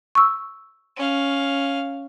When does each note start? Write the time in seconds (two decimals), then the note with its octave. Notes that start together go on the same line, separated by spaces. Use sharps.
0.15 C#6 E6
0.96 C#4 F5